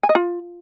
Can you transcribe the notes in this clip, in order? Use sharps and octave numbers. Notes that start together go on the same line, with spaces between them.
G#5
D#5
F4